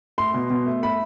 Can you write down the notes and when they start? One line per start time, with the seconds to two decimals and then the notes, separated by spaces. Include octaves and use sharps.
0.18 A3 C6
0.34 B2
0.50 B2
0.66 A3
0.83 A3 B5